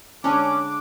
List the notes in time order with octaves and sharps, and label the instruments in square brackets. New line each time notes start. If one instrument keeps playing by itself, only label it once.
[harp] D3 G#3 [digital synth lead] C#4 [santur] D4 [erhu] D6